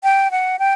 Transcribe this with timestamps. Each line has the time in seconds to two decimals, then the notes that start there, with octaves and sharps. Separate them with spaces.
0.03 G5
0.31 F#5
0.59 G5